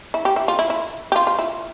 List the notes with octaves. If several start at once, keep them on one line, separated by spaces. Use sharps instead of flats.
E4
G4
E4
F4
E4
E4
G4
F4
F4
E4